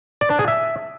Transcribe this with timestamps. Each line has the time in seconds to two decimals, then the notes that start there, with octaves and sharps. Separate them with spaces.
0.21 D5
0.30 D4
0.39 G#4
0.48 E5